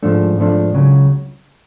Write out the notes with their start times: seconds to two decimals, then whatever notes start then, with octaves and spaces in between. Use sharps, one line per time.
0.03 G#2 F3 A3 D4
0.38 G#2 F3 A3 D4
0.73 C#2 C#3 F#3